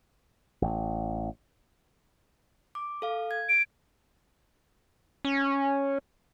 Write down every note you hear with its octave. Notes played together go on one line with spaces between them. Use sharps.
A1
D6
A4 F5
G#6
D7
C#4